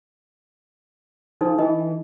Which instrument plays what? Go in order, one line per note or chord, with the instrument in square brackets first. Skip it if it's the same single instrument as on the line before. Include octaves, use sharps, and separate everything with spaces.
[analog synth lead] F3 [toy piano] D4 D#4 A4
[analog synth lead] E3 [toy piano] D#5